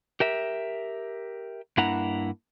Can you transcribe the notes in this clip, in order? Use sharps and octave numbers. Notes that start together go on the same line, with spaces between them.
G4 A#4 E5
G2 A#3 D4 E4 F#5 A#5